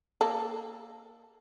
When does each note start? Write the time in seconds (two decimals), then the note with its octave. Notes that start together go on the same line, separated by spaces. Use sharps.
0.21 A#3 A4